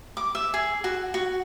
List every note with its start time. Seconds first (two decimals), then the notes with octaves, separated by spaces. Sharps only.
0.17 D6
0.35 E5
0.54 G#4
0.84 F#4
1.14 F#4